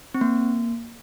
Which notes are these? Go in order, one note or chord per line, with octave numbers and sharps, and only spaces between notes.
C4
A#3